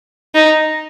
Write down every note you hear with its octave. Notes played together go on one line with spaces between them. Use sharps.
D#4